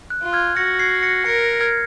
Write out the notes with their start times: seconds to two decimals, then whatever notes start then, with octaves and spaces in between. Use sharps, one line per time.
0.10 F#6
0.22 F4
0.33 F6 G#6
0.57 F#4 A#6 C#7
0.79 G#6 C7
1.03 A#6 C#7
1.26 A#4 A#6 C#7
1.61 F6 G#6